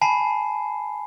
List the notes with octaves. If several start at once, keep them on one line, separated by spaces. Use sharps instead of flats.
G#5 A5 B5 C7